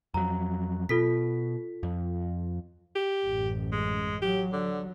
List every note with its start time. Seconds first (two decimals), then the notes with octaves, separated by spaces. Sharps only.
0.14 F2 F#3 A#5
0.89 B2 F4 A4 B6
1.83 F2
2.95 G4
3.26 A1 F#2
3.72 G#3
4.22 F#3 G4
4.53 D3